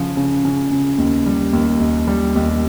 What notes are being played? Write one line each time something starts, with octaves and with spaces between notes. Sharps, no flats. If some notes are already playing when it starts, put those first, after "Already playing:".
Already playing: C#3 F3
C#3
C#3
C#3
D#2
G3
D#2
D#2
G3
D#2